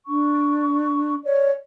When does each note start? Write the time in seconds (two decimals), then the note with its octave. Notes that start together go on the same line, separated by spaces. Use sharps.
0.07 D4 C#6
1.23 C#5 D5